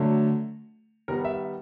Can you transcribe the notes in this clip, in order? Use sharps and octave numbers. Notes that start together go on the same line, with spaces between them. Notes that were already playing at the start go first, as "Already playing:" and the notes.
Already playing: D3 F#3 A3
D#3 G3 B3 A#4
E5